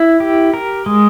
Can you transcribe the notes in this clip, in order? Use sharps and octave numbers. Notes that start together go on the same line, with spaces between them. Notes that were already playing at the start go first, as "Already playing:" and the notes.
Already playing: E4
G4
A#4
G#3